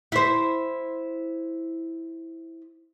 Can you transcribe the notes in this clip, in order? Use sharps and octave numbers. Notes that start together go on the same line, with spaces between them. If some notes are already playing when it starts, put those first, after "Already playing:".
E4 C5